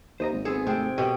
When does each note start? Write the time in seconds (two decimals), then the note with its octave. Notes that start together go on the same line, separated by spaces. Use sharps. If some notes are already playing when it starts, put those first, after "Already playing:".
0.20 D#2 C5 D#5 A#5
0.33 G#1
0.45 B3 C4 G#4 A4
0.67 C3 A3 G#4 A4 G5
0.98 B2 G4 A4 D#5